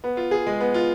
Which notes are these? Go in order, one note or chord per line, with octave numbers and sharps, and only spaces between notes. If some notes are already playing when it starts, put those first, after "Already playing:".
B3
F4
G#4
G#3
B3
F4